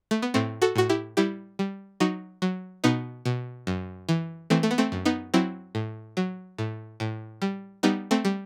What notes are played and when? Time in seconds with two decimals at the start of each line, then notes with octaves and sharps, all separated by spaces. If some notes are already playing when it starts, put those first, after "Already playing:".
0.11 A3
0.22 B3
0.34 A2 A3 C4
0.62 F#4 A4
0.75 A2 F#4
0.89 E4 G4
1.17 G3 E4 G4
1.59 G3
2.00 F#3 D#4 F#4
2.42 F#3
2.84 B2 B3 D#4
3.25 B2
3.67 F#2
4.09 E3
4.50 E3 A3 C4
4.63 A3
4.71 B3
4.78 A3 C4
4.92 F#2
5.05 B3 D#4
5.34 F#3 C4 E4
5.75 A2
6.17 F#3
6.58 A2
7.00 A2
7.42 G3
7.83 G3 B3 D#4
8.11 A3 C4
8.25 G3